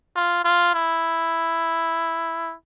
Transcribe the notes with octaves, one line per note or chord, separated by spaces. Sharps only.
F4
F4
E4